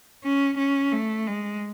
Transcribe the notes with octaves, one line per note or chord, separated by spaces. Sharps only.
C#4
C#4
A3
G#3